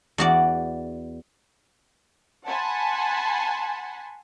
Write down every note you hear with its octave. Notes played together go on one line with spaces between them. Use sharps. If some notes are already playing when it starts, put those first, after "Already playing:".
E2 F#4 D5
F#5 G#5 A5 B5 C6